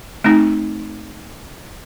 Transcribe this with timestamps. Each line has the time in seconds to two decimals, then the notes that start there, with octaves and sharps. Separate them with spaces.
0.24 A3 C4 D#4